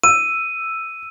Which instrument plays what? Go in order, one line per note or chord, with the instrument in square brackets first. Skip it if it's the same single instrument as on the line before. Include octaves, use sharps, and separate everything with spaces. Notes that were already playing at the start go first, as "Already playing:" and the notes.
[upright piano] E6 [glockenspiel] D#7